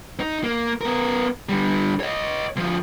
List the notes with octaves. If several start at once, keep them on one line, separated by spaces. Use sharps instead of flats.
D#4
A#3
B3 A#4
D3 G3
C#5 D#5
D2 F3